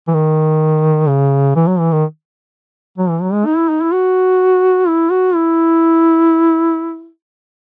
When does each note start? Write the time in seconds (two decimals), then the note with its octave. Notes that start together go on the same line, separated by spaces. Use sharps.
0.08 E3
0.14 D#3
1.09 C#3
1.56 E3
1.67 F#3
1.79 E3
1.92 D#3
2.98 F#3
3.10 E3
3.22 F#3
3.33 G#3
3.46 D#4
3.57 E4
3.69 D#4
3.82 E4
3.93 F#4
4.88 E4
5.11 F#4
5.35 E4